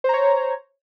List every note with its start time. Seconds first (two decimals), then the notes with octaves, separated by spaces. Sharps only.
0.04 C5
0.09 A#5
0.14 C#5